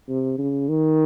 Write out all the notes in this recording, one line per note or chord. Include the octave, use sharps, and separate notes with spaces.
C3
C#3
D#3